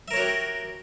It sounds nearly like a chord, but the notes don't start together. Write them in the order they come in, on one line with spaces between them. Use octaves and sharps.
E5 A#4 C#5 F#4 G4